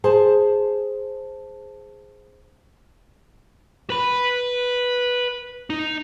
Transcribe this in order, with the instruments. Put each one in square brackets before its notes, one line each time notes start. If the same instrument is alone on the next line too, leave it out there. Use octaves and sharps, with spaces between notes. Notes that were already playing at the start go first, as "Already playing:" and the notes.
[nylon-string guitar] G#4 C5 A5
[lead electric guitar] B4 B5
D#4